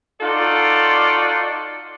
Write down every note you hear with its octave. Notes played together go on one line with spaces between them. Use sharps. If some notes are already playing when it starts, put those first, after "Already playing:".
D#4 F4 F#4 A4 D5